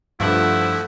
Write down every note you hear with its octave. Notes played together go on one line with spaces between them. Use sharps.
G2 F3 A3 E4 F4 F#5